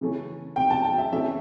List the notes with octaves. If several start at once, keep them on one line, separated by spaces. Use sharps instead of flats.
C#3 E3 A3 C#4
G5
A5
G5
E5
E3 A3 C#4 E5